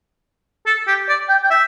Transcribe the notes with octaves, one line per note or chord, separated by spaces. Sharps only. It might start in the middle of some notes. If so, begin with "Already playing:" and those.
A4
G4
D5
G5
G5
E5